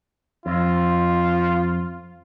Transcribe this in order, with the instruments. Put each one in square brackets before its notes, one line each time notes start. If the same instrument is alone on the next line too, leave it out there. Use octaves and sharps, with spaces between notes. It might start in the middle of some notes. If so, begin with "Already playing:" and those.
[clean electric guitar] F2 [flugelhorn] F4